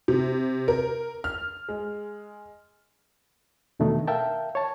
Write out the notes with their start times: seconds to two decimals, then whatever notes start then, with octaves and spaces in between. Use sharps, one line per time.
0.08 C3
0.68 A#4
1.24 F6
1.69 G#3
3.79 E2 B2 D#3 A3 D4 D#4
4.07 A#4 E5 F5 G5 A5
4.55 C#5 A5